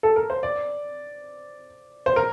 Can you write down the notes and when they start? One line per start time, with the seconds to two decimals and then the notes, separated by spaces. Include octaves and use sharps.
0.03 A4
0.16 A#4
0.30 C5
0.43 D5
2.06 C5
2.16 A#4